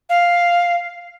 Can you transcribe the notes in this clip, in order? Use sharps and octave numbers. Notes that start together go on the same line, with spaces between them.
F5